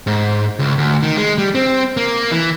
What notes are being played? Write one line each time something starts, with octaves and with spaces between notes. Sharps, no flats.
G#2
C#2
D2
D#3
G#3
G3
C4
A#3
E3